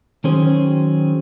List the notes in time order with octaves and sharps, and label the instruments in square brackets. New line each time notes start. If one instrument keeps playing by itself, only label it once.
[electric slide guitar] D#3 F#3 C#4 G#4 C5